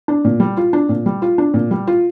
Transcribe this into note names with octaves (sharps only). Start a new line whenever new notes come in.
D4
A#2
G3
F4
D4
A#2
G3
F4
D4
A#2
G3
F4